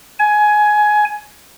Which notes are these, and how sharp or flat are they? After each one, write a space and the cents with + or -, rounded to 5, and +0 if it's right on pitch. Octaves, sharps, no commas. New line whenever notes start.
G#5 +15